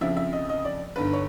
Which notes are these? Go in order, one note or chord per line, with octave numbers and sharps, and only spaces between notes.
F2 C#3 F3 E5
E5
D#5
D#5
D5
G1 G2 D#3 B4
C#5